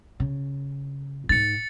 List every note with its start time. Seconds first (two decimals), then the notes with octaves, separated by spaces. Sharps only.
0.20 C#3
1.29 G#2 D#4 A6 C#7